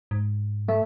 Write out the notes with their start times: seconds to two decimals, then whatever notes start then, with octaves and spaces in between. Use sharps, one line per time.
0.11 G#2
0.68 A3